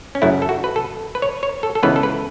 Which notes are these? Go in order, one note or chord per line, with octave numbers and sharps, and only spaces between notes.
C#4
F#2 C#3 F#3 A3 E4
A4
F#4
B4
A4
B4
C#5
C#5
A4
A4
C#2 C#3 E3 B3 B4
A4
B4